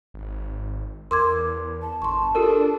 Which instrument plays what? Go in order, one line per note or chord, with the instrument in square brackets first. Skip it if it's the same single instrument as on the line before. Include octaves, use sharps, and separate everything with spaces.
[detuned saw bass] G#1
[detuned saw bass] E2 [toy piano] A#4 [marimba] C6 D6 G#6
[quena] A5
[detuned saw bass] G1 [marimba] C6 C#6
[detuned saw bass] D4 [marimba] F4 [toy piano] G4 A4 A#4